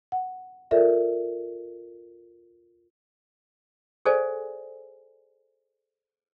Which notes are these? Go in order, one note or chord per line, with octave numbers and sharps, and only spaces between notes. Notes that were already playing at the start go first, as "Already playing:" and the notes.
F#5
F4 A4 A#4 D5 E5
G#4 A4 C5 D5 F5 G#5